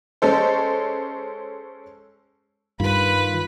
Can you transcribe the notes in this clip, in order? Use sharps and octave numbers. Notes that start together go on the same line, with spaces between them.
G#3 C#4 A4 C5
G2 D#3 F4 B4 B5